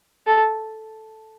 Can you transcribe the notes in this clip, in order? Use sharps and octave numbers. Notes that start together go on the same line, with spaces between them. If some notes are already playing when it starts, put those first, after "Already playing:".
A4